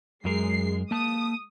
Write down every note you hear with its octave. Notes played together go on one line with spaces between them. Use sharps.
F#2 G#3 A#4 C7
A#3 A5 D#6